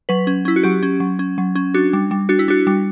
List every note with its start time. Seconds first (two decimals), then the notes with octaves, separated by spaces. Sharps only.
0.09 F#3 B4
0.27 C#4
0.45 C#4 E4
0.56 F#4
0.63 F#3 G4
0.83 C#4
1.00 F#3
1.19 C#4
1.38 F#3
1.55 C#4
1.74 D4 F#4
1.93 G3
2.11 G3
2.29 D4 F#4
2.39 E4
2.48 D4 F#4
2.67 G3